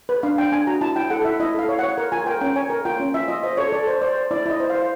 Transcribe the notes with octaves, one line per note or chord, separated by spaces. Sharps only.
B4
D4 F5
D4 G5
D4 G#5
F#4 A#5
E4 A5
E4 G5
A4 F#5
E4 E5
E4 D#5
A4 F5
C#5
F#5
C#5
A#4
F4 G#5
A#4 G5
C#4 G5
C#5 G#5
A#4
F4 G5
C#4
F4 E5
F4 D#5
C5 D#5
A4 C#5
A4 D5
C5
C5 D5
C5
E4 D5
E4 D#5
C5
F5
C5